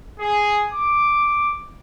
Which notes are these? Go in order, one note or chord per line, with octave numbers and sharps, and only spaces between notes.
G#4
D6